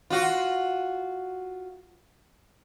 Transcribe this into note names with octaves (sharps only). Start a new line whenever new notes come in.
F4 F#4